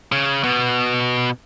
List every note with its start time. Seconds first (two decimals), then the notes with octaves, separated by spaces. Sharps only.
0.12 C#3
0.44 B2